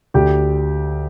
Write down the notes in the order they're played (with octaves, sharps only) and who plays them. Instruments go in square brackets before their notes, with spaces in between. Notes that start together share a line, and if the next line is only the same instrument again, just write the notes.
[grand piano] D2 [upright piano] G4 G5